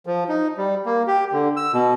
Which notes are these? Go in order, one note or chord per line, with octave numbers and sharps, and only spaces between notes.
F3
D#4
G3
A#3
G4
D3
E6
B2